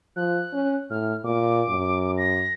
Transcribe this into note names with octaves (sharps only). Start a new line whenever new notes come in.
F3 F#6
C#4
A2 F6
A#2 D6
F#2
A#6